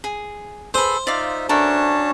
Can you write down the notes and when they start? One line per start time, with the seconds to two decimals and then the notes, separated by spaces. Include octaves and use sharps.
0.04 G#4
0.74 G#4 A4 B4 C5
1.07 D#4 F4 D5 E5 F5 D6
1.49 C#4 D4 F#4 A4 A#4 C#5 E5 A5